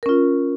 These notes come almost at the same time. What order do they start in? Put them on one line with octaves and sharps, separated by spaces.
A#4 C#4 F4